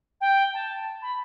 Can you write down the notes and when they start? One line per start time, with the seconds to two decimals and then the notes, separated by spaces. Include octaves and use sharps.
0.21 G5
0.54 A5
1.02 B5